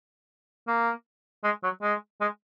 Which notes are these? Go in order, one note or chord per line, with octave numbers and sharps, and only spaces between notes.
A#3
G#3
F#3
G#3
G#3